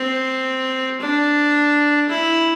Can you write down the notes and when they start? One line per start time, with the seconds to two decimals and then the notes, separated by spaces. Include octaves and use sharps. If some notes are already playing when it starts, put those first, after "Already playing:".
Already playing: C4
1.01 D4
2.09 E4